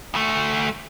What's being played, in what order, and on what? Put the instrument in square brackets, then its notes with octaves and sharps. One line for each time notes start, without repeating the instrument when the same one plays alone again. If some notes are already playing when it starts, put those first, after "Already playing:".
[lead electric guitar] D2 A3